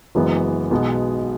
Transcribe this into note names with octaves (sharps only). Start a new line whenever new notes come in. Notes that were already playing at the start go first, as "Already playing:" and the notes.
F#1 F#2 E3 G#3 B3
B1 B2 G#3 B3